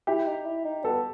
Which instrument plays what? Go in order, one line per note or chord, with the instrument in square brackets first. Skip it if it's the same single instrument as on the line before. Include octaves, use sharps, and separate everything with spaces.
[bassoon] E4 [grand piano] G4
[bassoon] D#4
E4
D#4
[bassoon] B3 [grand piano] A4